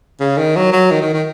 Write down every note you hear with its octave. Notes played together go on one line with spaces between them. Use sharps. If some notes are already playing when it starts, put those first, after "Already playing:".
C#3
D#3
F#3
F#3
D#3
D#3
D#3